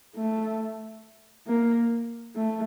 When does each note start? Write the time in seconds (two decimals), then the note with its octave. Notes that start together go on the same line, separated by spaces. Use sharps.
0.15 A3
1.47 A#3
2.36 A3